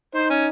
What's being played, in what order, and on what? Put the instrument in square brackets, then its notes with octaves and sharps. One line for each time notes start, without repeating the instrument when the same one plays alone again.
[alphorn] D#4 [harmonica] C5
[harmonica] C#4